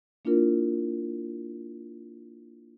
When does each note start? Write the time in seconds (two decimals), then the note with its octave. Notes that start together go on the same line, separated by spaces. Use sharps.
0.25 A#3 D4 E4 F4 A#4